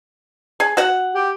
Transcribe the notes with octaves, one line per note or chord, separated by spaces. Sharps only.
G#4
F#4 F#5
G4